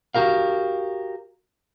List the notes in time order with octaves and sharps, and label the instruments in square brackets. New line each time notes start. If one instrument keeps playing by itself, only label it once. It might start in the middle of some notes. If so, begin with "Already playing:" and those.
[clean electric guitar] F#4 G4 A#4 F5